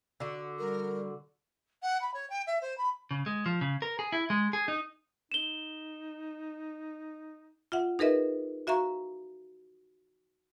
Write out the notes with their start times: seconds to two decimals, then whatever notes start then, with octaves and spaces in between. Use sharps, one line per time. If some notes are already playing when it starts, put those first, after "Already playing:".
0.20 D3 F#4
0.59 G3 A#4
1.82 F#5
2.01 B5
2.14 C#5
2.30 G5
2.47 E5
2.61 C5
2.78 B5
3.11 C#3
3.26 G#3
3.46 F3
3.61 C#3
3.82 A#4
3.99 G#4
4.12 E4
4.30 G#3
4.53 G#4
4.68 D#4
5.32 D#4 E7 G7
7.72 F4 E5 F#5
7.99 D#4 G#4 A#4 B4 D#5 E5
8.67 F#4 E5 F5 A#5 C#6